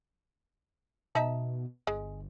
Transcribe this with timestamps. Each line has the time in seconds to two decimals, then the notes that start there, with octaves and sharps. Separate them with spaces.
1.15 B2 D#4 E5 A5
1.87 G1 G#3